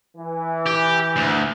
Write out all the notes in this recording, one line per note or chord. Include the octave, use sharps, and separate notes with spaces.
E3
G4
D2